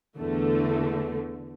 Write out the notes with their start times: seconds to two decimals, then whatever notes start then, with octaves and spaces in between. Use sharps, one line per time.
0.17 E2 D3 A3